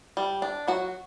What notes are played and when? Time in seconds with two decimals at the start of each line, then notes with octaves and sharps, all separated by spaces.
0.17 G3
0.42 D4
0.68 F#3 F#4